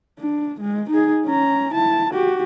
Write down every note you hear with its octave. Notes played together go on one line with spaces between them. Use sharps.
D4
G#3
D#4 G#4
C#4 A#5
E4 A5
F#4 G4